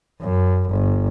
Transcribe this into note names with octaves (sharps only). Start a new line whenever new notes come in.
F#2
G1